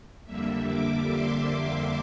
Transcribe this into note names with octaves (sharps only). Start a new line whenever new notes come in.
F2 D3 G3 A#3 E5
D6
C6